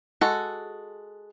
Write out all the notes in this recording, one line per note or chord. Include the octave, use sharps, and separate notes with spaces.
G#3 F#4 A4